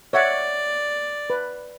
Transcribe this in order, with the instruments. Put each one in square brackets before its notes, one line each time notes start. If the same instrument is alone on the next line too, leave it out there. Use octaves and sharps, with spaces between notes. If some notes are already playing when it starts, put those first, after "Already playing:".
[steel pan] C#5 E5 F#5 [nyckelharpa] D5
[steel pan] B4